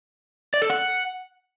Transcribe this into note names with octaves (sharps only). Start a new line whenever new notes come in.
D5
A4
F#5